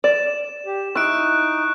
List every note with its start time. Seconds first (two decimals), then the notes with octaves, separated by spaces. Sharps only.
0.04 D5 E7
0.66 G4
0.95 D#4 E4 C#6 F#6 D7